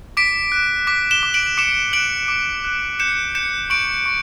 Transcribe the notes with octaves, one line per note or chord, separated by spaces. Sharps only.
D6 B6 D7
F#6
D6 B6
E7 G7
D6
D7 F#7
D6 C#7 E7
F#6 D7 F#7
D6
F#6
G6 C#7 E7
G6 C#7 E7
C#6 D7 F#7
C#6